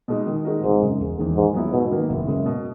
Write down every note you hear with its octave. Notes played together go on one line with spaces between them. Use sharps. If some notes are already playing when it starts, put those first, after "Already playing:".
B2 G#3 D#4
D#3
G#3 D#4 F#4 A#4
G#1 G#2
F#2 C#3 G#3
E1
E2 D#3 G#3
G#2 D#3
F#3 B3 E4
G#2 B2
D#3 A#3
F#1
F#2 C#3 G#3
B2